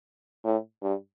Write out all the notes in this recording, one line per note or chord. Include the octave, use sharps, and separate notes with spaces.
A2
G2